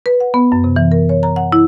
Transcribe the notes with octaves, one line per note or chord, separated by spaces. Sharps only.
B4
F#5
B3
F#2
C3
E3
A#4
C#5
A#5
F#5
E4